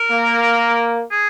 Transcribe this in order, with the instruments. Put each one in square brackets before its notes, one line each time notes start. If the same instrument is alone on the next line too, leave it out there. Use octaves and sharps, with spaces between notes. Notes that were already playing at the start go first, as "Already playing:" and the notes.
Already playing: [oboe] A#4
[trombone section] A#3
[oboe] G#4